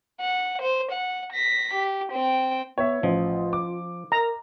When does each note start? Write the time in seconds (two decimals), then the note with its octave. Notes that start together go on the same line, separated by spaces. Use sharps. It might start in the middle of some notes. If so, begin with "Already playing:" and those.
0.21 F#5
0.62 C5
0.92 F#5
1.33 A#6 B6
1.74 G4
2.12 C4 G5
2.78 B3 C#5 E5
3.03 A1 F3 F4
3.53 D6
4.12 A#4 A#5